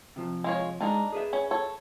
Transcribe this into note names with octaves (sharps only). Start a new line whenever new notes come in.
C3 F3
G#3 F4 C#5
G#3 D4 D#4 A#4
G#4 B4 E5
C#4
A4 C#5